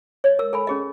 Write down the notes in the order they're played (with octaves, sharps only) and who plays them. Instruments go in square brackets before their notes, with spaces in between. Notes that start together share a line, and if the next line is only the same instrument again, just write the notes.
[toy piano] C#5 D#5
A#4 E6
A4 G#5 B5
C#4 G#4 D#5